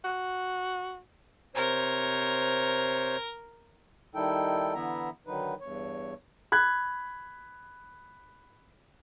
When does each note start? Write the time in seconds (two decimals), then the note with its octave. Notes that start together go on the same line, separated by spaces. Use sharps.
0.04 F#4
1.55 C3 A#4 C5 C#5
4.15 D#3 G3 D#4 E4 A4 G5
4.74 D3 E3 B3 E4 E5 A#5
5.27 D3 D#3 F#3 D#4 B4
5.61 E2 G2 C#5
6.52 B5 F#6 G#6